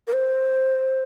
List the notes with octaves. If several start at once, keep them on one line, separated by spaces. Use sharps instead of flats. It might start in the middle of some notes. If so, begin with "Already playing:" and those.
A#4
C5